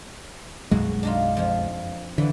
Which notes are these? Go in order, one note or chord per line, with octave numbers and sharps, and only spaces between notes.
B1 F#2 G#3 F#4
D4 D#4 F4
F2 F3
D3 E3